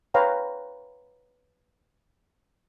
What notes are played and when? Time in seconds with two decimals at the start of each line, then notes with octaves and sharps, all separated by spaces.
0.14 B4 C#5 F5 G5 A#5